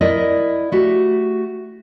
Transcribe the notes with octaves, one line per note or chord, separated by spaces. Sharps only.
E4 A#4 D5 D#5
A3 F#4 G4